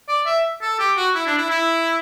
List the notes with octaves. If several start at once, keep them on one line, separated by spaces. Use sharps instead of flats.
D5
E5
A4
G4
F#4
E4
D4
E4
E4